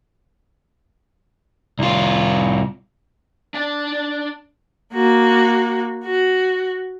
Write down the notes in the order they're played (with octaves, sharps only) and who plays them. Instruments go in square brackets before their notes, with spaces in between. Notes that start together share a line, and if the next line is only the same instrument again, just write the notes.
[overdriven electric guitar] C2 F4
[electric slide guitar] D4 D5
[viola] A#3 F#4
F#4